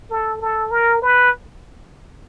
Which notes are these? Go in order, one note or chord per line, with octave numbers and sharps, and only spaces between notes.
A4
A4
A#4
B4